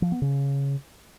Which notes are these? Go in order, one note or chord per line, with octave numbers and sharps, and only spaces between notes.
F3
B3
C#3